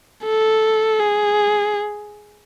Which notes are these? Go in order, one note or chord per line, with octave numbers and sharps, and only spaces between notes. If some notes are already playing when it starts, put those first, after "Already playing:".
A4
G#4